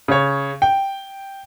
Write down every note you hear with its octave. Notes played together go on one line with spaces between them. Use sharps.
C#3 C#5
G5